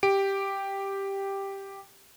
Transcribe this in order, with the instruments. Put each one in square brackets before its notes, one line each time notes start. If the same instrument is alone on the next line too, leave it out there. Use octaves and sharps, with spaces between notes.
[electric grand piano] G4 D7